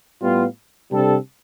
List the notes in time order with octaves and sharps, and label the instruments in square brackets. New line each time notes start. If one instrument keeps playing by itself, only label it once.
[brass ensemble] A2 G3 B3 F4
C3 G3 D4 A4